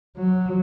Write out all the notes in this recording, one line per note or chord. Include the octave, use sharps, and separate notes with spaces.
F#3